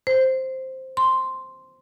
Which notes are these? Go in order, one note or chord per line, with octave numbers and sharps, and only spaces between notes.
C5
C6